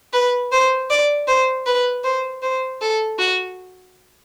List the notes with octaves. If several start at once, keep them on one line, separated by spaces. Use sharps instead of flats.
B4
C5
D5
C5
B4
C5
C5
A4
F#4